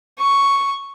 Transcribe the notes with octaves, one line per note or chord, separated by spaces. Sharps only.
C#6